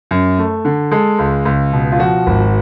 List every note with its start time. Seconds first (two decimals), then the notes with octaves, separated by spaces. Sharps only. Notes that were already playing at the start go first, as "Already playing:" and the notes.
0.11 F#2
0.39 A3
0.65 D3
0.92 G#3 A4
1.19 C#2
1.45 C#2
1.73 B2
1.92 F4
1.99 F3 F#4
2.26 G#1